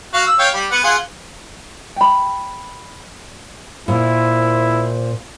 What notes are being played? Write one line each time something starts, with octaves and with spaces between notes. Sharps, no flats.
F#4 F5
E6
C#5 F5 G5
G3
B3 F#5
F4 G#4 F#5
G5 B5
A#2 E4 C5